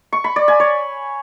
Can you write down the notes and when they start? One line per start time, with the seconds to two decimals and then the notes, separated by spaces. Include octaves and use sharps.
0.13 C#6
0.24 B5
0.36 D5
0.48 G#5
0.60 C#5